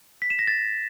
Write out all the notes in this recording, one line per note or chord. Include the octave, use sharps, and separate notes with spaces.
B6
E7
A#6
A6